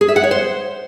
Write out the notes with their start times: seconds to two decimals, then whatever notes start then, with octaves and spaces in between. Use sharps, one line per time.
0.01 G#4
0.08 E5
0.16 F#5
0.23 C#5
0.31 C5